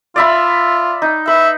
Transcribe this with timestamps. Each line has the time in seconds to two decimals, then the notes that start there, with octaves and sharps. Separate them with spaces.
0.16 F4 D5 E5 B5
1.02 D#4
1.27 B4 E5